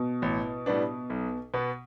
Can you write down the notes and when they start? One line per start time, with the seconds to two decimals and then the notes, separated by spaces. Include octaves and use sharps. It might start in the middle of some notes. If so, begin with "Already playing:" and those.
Already playing: B2
0.22 A1
0.66 A2 G3 B3 D4
1.10 B1
1.54 B2 B3